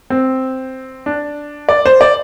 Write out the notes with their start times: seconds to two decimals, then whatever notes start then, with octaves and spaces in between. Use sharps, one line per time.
0.10 C4
1.06 D4
1.69 D5
1.86 C5
2.01 D5